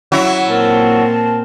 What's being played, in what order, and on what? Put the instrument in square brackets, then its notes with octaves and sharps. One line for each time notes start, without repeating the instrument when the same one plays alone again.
[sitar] F#3 E4
[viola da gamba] A#2 C4 [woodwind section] A#4 A5